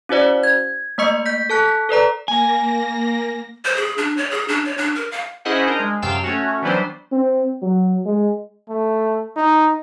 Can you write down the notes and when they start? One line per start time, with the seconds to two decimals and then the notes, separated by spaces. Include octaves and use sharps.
0.09 C#4 E4 F#4 C5 D5
0.43 G#6
0.98 A3 A#3 D#5 C#6 C#7
1.26 G6 B6
1.50 A4 A5 F#6 B6
1.89 A4 B4 D5 A#5
2.28 A#3 G#5 A#6
3.65 C5
3.76 G#4
3.98 D4
4.17 C#5
4.31 G#4
4.48 D4
4.65 C#5
4.78 D4
4.95 A#4
5.11 F5
5.45 C#4 E4 G#4 C5 D#5 F#5
5.67 D4 A#4 C5 D#5
5.80 G#3
6.02 F#2 C3 F3 F5 G5 E7
6.23 A3 C#4 F#4
6.62 E3 F#3 G3 B3 D4 C5
7.12 C4
7.62 F#3
8.05 G#3
8.69 A3
9.36 D#4